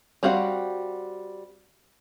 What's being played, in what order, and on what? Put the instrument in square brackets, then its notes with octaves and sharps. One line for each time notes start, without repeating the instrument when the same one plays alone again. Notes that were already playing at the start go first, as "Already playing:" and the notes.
[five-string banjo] G3 C4 F#4 F5 F#5